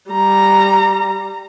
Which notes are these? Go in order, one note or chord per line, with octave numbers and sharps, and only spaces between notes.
G3 A#5